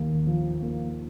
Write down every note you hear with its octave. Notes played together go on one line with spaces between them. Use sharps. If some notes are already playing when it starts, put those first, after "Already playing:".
Already playing: D#2 A#3
F3
A#3